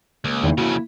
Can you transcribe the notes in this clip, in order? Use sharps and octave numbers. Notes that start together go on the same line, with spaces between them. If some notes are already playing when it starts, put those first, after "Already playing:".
C#2 A#3
E2 D#3 E3
F2 C#3 E4 F#4